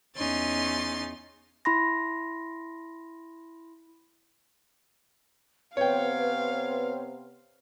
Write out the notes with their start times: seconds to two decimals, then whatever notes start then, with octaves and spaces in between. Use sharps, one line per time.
0.16 E2 C#4 D#4 C6 A6
1.65 E4 B5 C6 A#6
5.77 C3 B3 C4 B4 C#5 F5 G5